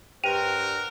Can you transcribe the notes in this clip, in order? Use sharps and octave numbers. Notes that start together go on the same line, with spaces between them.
G2 F#4 A#4 C5 G5 D#7 F7